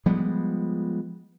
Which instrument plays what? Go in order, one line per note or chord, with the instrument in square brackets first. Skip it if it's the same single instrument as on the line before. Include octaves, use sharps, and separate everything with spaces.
[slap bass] F3 G3 G#3 B3